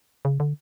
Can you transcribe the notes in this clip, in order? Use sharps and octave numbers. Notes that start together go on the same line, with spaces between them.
C#3
D3